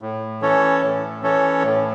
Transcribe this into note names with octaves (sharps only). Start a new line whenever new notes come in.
A2
E3 C#4 A4 C#5
A2
E3 C#4 A4 C#5
A2